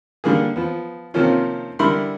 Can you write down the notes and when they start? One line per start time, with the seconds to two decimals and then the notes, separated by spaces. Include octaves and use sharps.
0.24 D3 G3 A#3 G#4
0.56 F3 B3
1.14 C3 D#3 F3 A#3 C#4 F4
1.79 D3 G3 E4 A#4 B5 C6